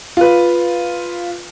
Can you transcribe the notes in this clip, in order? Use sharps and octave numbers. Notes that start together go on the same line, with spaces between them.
F4 B4